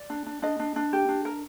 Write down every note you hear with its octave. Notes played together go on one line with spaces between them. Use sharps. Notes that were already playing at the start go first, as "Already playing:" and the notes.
Already playing: D5
D4
D4
D4 D#5
D4
D4
G4
D4
A#4